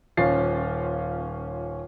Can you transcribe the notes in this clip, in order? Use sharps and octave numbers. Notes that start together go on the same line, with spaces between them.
D#1 C#4 F4 A6 C7